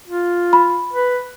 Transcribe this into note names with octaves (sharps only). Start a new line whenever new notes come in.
F4
B5
B4